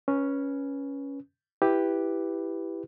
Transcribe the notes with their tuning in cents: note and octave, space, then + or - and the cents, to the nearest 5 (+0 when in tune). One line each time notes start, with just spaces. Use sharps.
C#4 +0 B4 -20
E4 +0 G4 +0 B4 +0